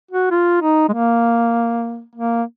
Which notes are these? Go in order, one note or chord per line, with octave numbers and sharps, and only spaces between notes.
F#4
F4
D#4
G#3
A#3
A#3